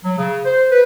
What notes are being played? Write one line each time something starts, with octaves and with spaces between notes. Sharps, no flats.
F#3
C#3
C5
B4